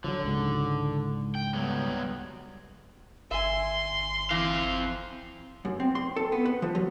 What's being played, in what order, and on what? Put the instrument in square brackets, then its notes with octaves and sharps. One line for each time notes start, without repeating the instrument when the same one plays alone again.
[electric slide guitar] D3 [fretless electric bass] F3 F#3
[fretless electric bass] C#2 G#2
[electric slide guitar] G5
F#3 G3 B3
[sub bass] G1 [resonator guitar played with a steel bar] E5 G#5 [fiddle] C6
[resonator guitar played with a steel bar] E3 [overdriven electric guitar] C4 F5
[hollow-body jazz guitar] F#2
C4
C6
A4
B3
B4
F3
F#3